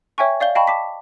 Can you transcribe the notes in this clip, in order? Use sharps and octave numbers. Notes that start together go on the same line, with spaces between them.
C#5 E5 G5 G#5 C#6
D5 F5 G6 G7
D#5 F5 G5 A5 B5 C#6
A5 D6 B6